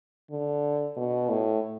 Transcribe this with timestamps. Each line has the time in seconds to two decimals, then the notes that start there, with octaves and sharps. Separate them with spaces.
0.31 D3
0.97 B2
1.30 A2